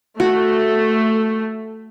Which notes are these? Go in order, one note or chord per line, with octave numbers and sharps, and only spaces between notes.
A3 F#4